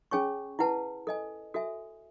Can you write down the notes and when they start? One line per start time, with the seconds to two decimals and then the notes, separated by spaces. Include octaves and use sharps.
0.11 C#4 G#4 C#5 G#5 C#6
0.59 E4 B4 F#5 A5
1.07 A4 D#5 G#5
1.54 F#4 A4 E5 G#5